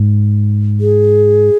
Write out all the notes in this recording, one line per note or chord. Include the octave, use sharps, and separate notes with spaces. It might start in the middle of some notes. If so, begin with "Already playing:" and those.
Already playing: G#2
G#4